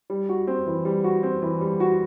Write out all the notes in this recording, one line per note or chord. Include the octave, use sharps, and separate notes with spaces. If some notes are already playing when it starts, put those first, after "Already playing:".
G3
F#4
C4
E3
G3
F#4
C4
E3
G3
F#4